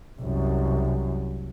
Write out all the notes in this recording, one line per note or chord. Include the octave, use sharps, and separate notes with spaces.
C2 F#2